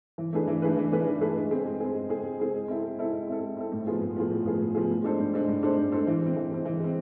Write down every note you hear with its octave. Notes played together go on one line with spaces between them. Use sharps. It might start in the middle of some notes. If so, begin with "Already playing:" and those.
E3
A3 D4 G#4 B4
E3
A3 D4 G#4 B4
E3
A3 D4 G#4 B4
E3
A3 D4 G#4 B4
G#3
C4 G#4
G#3
C4 G#4
G#3
C4 G#4
G#3
C4 G#4
G#3
C4 E4 A4
G#3
C4 E4 A4
G#3
C4 E4 A4
G#3
C4 E4 A4
A2
F3 B3 F4 G#4
A2
F3 B3 F4 G#4
A2
F3 B3 F4 G#4
A2
F3 B3 F4 G#4
A2
G#3 D4 A4 C5
A2
G#3 D4 A4 C5
A2
G#3 D4 A4 C5
A2
G#3 D4 A4 C5
E3
G#3 C4
E3
G#3 C4
E3
G#3 C4